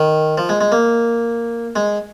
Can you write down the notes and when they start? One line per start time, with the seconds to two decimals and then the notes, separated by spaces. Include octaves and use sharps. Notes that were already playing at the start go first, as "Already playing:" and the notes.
Already playing: D#3
0.38 F3
0.49 G#3
0.61 G#3
0.72 A#3
1.76 G#3